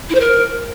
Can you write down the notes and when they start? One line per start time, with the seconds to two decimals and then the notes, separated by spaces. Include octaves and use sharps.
0.09 E4
0.14 C5
0.20 A#4